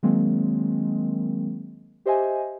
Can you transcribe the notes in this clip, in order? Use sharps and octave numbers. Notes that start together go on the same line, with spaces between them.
D#3 F#3 G#3 A#3 C4
G4 C5 D#5 E5 G#5